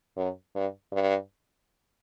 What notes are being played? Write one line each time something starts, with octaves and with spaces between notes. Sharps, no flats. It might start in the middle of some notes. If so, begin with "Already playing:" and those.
F#2
G2
G2